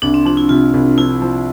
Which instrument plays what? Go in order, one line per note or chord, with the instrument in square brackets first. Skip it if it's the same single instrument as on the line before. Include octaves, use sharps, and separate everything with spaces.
[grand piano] C2 [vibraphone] D4
[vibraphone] C4
[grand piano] F3 [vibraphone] D4
[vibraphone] E4
[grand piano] C3 [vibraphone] F4
[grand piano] C2
[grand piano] F3 [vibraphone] E4
[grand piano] F3